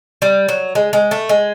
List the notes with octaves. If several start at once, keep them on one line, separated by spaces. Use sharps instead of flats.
G3
F#3
G#3
G#3
A3
G#3